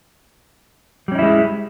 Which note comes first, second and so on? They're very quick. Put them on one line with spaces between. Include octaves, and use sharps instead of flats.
G3 C#4 D#4 E4 G#3